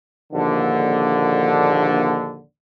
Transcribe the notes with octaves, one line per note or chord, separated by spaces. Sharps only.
A#1 D#2 D3